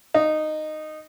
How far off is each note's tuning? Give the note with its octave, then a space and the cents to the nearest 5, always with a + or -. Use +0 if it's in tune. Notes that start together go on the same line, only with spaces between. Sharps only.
D#4 -10